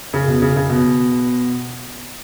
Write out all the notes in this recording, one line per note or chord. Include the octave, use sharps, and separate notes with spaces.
C#3
B2
C#3
C#3
B2